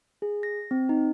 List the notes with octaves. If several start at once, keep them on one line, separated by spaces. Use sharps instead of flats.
G#4
A#6
C4
D#4